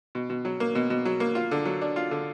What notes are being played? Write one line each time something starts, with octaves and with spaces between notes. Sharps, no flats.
B2
B2
F#3
A#3
B2
B2
F#3
A#3
F4
D3
F#3
D4
F4
D3